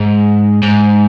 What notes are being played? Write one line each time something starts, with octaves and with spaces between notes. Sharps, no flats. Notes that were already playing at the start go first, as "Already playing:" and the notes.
Already playing: G#2
G#2